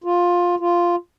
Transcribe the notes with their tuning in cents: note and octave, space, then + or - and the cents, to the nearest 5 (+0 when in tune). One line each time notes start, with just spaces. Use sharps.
F4 +10
F4 -5